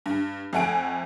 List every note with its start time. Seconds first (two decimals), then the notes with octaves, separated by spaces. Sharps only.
0.06 G2
0.53 F2 A3 F#5 G#5 D7